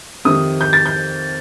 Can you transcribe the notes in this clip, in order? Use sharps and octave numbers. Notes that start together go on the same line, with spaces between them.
F2 C3 D#3 D#6
G6
A6
G6